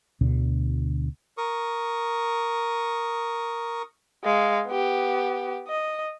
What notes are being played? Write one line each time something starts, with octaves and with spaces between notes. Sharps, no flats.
D2 B2 D3
A#4 C#6 D#6
G#3 F5
B3 G4
D#5